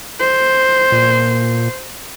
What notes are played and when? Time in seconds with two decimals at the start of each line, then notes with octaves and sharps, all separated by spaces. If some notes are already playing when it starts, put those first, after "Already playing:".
0.19 C5
0.92 A#2